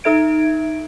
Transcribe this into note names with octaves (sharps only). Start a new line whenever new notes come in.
D#4 A4 E5 G#6 D7